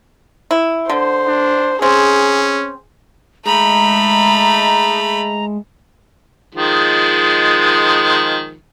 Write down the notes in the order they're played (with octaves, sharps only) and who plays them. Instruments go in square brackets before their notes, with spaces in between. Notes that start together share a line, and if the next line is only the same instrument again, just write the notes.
[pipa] E4
[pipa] D3 [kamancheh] C5
[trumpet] D4
[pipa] C4 [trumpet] C#4 [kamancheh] G#4
[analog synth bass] G#3 [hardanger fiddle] A3 B5 [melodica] D#4 [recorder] A#5
[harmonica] D#3 F3 G#3